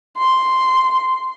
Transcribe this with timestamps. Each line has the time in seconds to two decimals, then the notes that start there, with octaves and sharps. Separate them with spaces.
0.18 C6